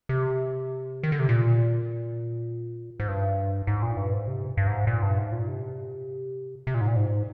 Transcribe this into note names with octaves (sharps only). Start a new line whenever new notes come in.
C3
D#3
D3
C3
A#2
G#2
G2
G#2
A#2
G2
G#2
C3
G2
G#2
A#2
G2
G#2
A#2
C3
C3
A#2
G#2
A#2
G#2